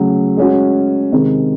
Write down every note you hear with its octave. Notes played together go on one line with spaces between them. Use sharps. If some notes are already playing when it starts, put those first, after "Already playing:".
Already playing: C#3 F#3 A3
G#3 C#4 F#4
C3 D#3 G#3 C4